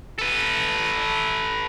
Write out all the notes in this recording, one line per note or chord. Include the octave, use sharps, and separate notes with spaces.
A4 B4